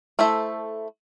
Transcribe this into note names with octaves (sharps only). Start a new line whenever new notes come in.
A3 E4 A4 C5 E5